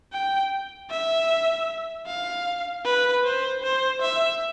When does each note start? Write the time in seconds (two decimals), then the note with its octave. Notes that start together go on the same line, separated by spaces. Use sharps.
0.12 G5
0.91 E5
2.07 F5
2.85 B4
3.24 C5
3.63 C5
4.02 E5